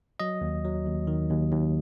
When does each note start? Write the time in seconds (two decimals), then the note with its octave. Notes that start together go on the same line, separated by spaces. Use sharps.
0.20 F#3 D#5
0.41 D#2
0.64 F#3
0.86 D#2
1.07 D#3
1.30 D#2
1.51 D#2